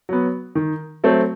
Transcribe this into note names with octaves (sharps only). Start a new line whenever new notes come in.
F#3 B3
D#3
F#3 A3 C4